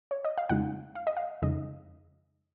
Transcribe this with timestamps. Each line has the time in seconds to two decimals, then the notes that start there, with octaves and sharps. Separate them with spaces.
0.11 C#5
0.24 D#5
0.38 F5
0.49 F2 C#3 G#3 D#4 F#5
0.95 F5
1.07 D#5
1.17 F5
1.42 F2 C#3 G#3 D#4 D#5